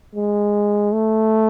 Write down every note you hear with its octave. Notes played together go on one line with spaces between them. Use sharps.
G#3
A3